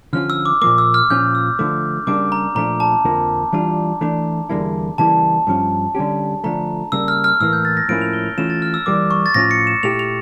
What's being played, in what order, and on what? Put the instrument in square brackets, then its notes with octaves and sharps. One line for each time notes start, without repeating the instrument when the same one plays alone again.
[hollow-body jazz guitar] D3 F3 C#4 F4 [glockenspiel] F6
[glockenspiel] E6
D6
[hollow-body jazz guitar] A#2 F3 A#3 [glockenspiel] D6
[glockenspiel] E6
F6
[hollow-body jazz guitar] A#2 F3 C#4 F4 [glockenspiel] G6
[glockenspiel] E6
[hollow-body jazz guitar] D3 F3 A3 [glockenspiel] D6
[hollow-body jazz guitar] C#3 G3 A#3 D4 G4 [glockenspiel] D6
[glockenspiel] A#5
[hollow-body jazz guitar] A#2 F3 A3 D4 [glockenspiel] A#5
[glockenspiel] A5
[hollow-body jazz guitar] F2 D3 F3 A#3
E3 G3 D4 F4
[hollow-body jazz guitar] E3 A3 D4 [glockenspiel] A#5
[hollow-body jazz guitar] E2 D3 G3 A#3 E4
[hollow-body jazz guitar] C#3 E3 G3 A#3 E4 [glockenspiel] A5
[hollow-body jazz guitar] G2 F3 C#4
D3 G3 C#4 G4
[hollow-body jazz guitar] D3 F3 A3 [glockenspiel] A#5
[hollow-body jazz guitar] C#3 G3 A#3 [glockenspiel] E6
[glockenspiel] F6
F6
[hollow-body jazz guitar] A2 E3 A#3 [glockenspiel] E6
[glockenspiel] G6
A6
A#6
[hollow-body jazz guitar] A2 F3 A#3 C#4 E4 [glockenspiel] D7
[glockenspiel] F7
G7
F7
[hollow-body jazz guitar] E3 A3 C#4 F4 [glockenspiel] E7
[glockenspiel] A6
F6
E6
[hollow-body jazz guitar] E3 G3 A#3 [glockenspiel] D6
[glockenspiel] C#6
A6
[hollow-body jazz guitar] A2 F3 C#4 F4 [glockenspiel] A#6
[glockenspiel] C#7
E7
[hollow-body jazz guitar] A#2 A3 E4 G4 [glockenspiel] F7
[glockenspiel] F7